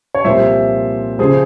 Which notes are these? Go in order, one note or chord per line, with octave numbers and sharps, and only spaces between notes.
C#5
C2 A#2 F3 C5 E5
C#3 F3 G#4 C5